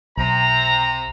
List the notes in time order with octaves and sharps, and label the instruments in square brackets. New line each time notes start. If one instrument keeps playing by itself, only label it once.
[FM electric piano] B1 [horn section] C3 A#5